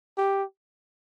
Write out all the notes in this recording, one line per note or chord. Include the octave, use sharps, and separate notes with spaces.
G4